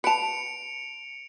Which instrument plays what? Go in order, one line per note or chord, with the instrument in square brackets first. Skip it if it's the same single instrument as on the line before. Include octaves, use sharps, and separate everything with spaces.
[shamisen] B4 A5 [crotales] C#7 D7 F7